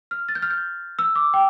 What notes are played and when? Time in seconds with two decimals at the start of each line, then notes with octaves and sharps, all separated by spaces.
0.11 F6
0.29 A6
0.35 G6
0.42 F6
0.50 G6
0.99 E6
1.15 D6
1.34 G5